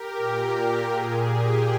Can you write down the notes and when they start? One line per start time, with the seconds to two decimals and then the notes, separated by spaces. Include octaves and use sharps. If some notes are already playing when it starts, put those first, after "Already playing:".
Already playing: G4 A#4
0.17 A#2
0.91 A#2 G#4
1.28 G4